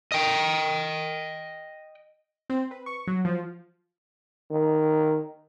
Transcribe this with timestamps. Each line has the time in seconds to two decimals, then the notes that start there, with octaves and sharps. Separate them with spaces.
0.12 D#5 G5
2.50 C4
2.71 B4
2.86 C#6
3.07 F#3
3.25 F3
4.50 D#3